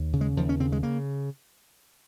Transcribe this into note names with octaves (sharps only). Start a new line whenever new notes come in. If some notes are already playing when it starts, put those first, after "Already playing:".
Already playing: D#2
C#3
G#3
D#2 F3
C#4
C#3 C4
G#3
C#3 A#3